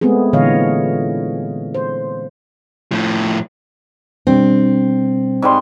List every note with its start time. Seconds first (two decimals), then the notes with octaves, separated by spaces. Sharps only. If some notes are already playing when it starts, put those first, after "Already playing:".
0.01 G#3 A3 B3 C4 G#4
0.33 A#2 D3 E3 C#5 D#5 F5
1.74 C5
2.91 A2 F3
4.27 B2 G3 C4 D4
5.42 G#2 G3 C6